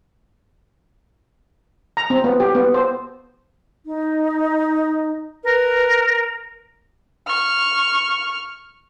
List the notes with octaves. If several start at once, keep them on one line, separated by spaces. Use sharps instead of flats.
A#5
C4
B3
G4
B3
C5
D#4
A#4 B4
C#6 F6